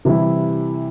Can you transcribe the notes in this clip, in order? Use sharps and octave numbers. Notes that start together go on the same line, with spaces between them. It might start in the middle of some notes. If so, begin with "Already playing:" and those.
C3 E3 G3 E4